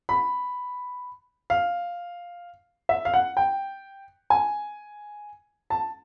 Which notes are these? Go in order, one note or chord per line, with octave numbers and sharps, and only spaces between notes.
B5
F5
E5
F5
F#5
G5
G#5
A5